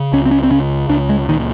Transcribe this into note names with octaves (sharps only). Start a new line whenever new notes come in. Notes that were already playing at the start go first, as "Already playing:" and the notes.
Already playing: C#3
C#2 C#4
C4
C#4
C4
C#3 C#4
C#2 D4
G#3
A#2 D#3